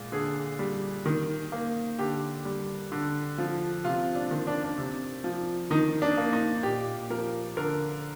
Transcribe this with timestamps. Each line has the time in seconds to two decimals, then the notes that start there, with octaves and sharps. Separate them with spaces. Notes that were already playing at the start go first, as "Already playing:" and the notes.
Already playing: A#2 G#3
0.12 D3 G#4
0.59 G3
1.06 D#3
1.52 A#3
1.99 D3 G4
2.45 G3
2.92 D3
3.38 F3
3.84 C3 F4
4.15 D4
4.31 D#3
4.47 D4
4.64 D4
4.78 C3
5.24 F3
5.71 D#3 D#4
6.02 D4
6.17 A#3
6.33 D#4
6.63 A#2 G4
7.10 F3 A#4
7.57 D3 A#4